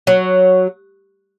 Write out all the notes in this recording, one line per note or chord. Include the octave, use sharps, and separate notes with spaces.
F#3